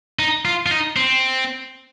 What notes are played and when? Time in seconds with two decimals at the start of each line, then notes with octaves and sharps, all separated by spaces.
0.19 D#4
0.45 F4
0.66 F4
0.71 D#4
0.96 C4